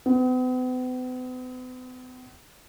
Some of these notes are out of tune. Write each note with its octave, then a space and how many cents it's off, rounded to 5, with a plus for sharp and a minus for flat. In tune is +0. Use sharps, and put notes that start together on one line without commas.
B3 +45